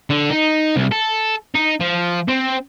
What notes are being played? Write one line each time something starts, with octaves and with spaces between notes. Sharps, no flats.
D3
D#4
C2
A4
D#4
F3
C4